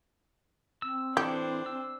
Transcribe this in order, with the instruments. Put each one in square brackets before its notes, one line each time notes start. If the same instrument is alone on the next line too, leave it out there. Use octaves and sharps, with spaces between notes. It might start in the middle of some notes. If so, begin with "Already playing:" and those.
[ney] C4 [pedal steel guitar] E6
[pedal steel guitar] E3 E4 A4 [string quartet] D4 C5 [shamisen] G4
[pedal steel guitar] E6